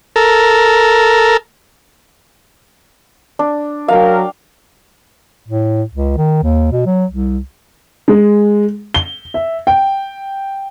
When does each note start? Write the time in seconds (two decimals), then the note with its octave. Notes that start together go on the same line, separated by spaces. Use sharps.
0.16 A4 A#4
3.39 D4
3.88 F#3 A#4 F5 G5
5.48 A2
5.93 C#2
6.17 D#3
6.43 D#2
6.72 B2
6.86 F#3
7.11 C2
8.08 G#3
8.94 G7
9.34 E5
9.67 G5